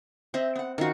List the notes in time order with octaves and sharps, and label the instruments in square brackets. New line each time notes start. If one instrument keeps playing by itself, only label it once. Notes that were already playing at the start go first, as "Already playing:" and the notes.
[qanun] C4 [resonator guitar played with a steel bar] C5 D#5 E5
[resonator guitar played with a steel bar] B3 F#5
[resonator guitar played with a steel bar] F#2 F3 F4 [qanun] D#3 F#4